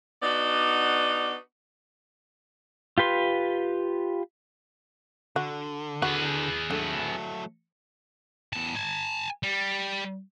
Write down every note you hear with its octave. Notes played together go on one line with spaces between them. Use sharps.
B3 D4 D#4 F#4 D5
F4 G4 B4 C6
D3 F#4
F#4 G#4 B4
D3 F#3 A3
E2 A5
G#5 A5
G3